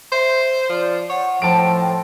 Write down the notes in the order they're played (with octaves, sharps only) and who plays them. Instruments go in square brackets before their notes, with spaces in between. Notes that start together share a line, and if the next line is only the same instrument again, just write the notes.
[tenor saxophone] C5 [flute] E5
[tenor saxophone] F3 [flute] D5
[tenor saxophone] C#5 [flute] F#5
[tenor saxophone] A2 [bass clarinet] F3 [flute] G5 [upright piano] A5 D7